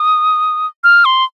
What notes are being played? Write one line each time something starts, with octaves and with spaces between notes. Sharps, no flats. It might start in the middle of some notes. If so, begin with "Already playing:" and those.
Already playing: D#6
F6
C6